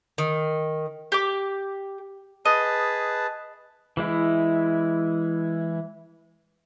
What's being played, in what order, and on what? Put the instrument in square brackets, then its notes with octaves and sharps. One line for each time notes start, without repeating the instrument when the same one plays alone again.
[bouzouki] D#3
[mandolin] G4 D6
[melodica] G#4 B4 A5 [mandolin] D#5
[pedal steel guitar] E3 G#3 E4